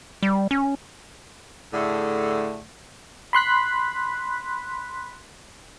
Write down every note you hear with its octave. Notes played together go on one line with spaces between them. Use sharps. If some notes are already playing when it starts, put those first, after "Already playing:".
G3
C#4
A2 D3 A3 G#4
B5 C6 F#6 B6